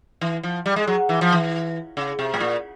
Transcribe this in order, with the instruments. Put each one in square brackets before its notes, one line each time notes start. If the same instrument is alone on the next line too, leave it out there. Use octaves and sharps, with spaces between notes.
[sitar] E3
F3
G3
G#3
F#3
E3
F3
E3
C#3
C3
A2
A#2